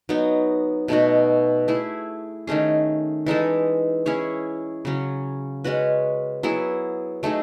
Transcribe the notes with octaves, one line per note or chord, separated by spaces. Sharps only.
F#3 B3 D#4
B2 A3 D#4 F#4
A3 E4 G#4
D#3 A3 C#4 G#4
E3 G#3 D#4 A4
C#4 E4 G#4 C#5
C#3 F#3 C#4
G#3 C#4 F#4 B4
F#3 B3 E4 G#4
F#3 A3 D#4 G#4